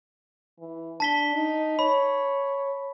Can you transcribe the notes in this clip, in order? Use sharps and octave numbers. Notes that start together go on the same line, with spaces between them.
E3
D4 A5 B6 G7
D#4
C#5 B5